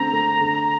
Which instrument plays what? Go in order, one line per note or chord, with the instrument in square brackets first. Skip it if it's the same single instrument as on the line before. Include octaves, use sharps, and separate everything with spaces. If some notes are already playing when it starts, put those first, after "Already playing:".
Already playing: [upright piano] D3 A3 C4 [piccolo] A#5
[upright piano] A3
D3